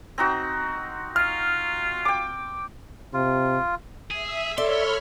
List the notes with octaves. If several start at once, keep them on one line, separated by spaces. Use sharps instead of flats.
C4 D#4 F#4
F4 F6
G5 D6
C3 F4
G#4 E5
A4 C#5 D5 E5 B5 C6 F6